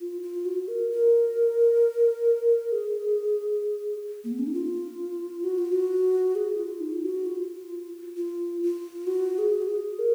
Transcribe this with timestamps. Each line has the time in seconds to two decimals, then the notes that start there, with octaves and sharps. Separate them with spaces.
0.01 F4
0.22 F4
0.45 F#4
0.68 A#4
0.91 A#4
2.72 G#4
4.24 A#3
4.32 B3
4.39 C#4
4.47 D#4
4.54 F4
5.44 F#4
5.58 F4
5.72 F#4
6.35 G#4
6.58 F4
6.80 D#4
6.93 F4
7.03 F#4
7.26 F4
8.17 F4
8.63 F4
9.07 F#4
9.38 G#4
9.62 F#4
9.68 G#4
9.99 A#4